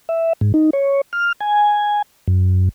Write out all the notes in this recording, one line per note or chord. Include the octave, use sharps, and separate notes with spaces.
E5
G#2
D#4
C#5
F6
G#5
F#2